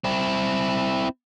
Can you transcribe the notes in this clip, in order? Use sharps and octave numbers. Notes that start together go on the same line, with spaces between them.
C4 E4